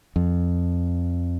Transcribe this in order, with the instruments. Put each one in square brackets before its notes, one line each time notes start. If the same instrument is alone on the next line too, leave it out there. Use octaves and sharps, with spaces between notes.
[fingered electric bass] F2